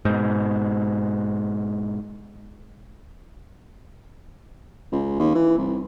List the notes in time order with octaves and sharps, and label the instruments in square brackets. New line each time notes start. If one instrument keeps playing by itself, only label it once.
[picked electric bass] G#2 B2
[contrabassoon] C#2
D#2
E3
C2